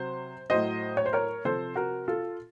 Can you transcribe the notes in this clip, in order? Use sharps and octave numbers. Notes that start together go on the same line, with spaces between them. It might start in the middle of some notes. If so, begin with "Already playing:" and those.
Already playing: C3 F#3 C5
A2 F#3 C5 D#5
C#5
C5
A#4 C#5
C3 F3 A4 C5
F#4 A#4
F4 A4